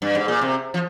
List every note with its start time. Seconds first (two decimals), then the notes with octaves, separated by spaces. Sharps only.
0.02 G2
0.15 G#2
0.28 A#2
0.41 C3
0.74 F3